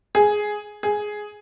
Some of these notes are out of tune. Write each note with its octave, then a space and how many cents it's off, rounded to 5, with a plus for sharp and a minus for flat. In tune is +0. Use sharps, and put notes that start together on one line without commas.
G#4 +5
G#4 +5